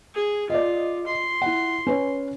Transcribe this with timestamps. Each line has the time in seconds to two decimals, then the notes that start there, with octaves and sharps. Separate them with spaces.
0.15 G#4
0.50 F4 D5 D#5
1.07 C6
1.42 E4 F#5
1.87 C#4 B4 C#5